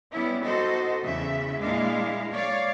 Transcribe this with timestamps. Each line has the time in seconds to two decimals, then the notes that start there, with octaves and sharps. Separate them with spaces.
0.11 G3 B3 C#4 E4
0.43 D#4 F#4 A4 C5 D#5
1.04 E2 C#3 E5
1.61 A#2 G#3 A#3 D4 E4 F5
2.32 C#5 D5 F5